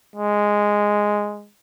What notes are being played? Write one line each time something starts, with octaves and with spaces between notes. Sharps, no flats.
G#3